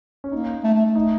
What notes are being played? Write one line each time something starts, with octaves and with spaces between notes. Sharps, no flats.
C#4
A#3 D#4
A3
A3
A3
D#4